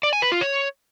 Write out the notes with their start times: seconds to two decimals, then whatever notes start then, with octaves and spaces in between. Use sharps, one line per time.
0.03 D5
0.13 G#5
0.22 B4
0.32 F4
0.41 C#5